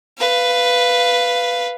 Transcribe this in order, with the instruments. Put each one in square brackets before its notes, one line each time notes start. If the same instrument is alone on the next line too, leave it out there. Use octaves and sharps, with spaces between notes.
[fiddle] B4 F5